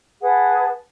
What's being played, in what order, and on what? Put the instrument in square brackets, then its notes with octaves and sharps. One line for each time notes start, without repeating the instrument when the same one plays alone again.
[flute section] G#4 B4 F#5 A5